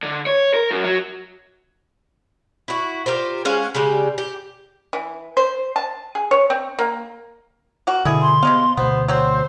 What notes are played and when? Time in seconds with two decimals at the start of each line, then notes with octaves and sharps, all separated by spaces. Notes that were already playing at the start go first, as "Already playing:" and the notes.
0.03 D3
0.27 C#5
0.54 A#4
0.71 F#2
0.84 F#3
2.68 E4 F#4
3.06 F4 G4 A#4 C5
3.45 G#3 C#4 F5 F#5
3.75 C#3 G3 G#3 G4
4.18 G4
4.93 E3
5.37 C5
5.76 A5
6.15 G#4
6.31 C#5
6.50 C4
6.79 A#3
7.87 A#3 F#4
8.05 B2 D3 E4 G#4
8.21 C6
8.43 C3 G#3 B3 F5
8.77 D2 B2 B3 C5
9.08 F#3 C4 C5